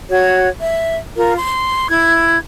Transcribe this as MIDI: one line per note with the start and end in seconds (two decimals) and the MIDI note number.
0.10 0.47 66
0.10 0.47 73
0.10 0.47 92
0.58 0.96 76
1.17 1.35 65
1.17 1.35 70
1.37 1.89 84
1.89 2.38 64
1.89 2.38 92